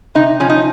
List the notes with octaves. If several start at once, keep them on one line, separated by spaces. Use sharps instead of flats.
C3 D#4
F3 C#4
D#4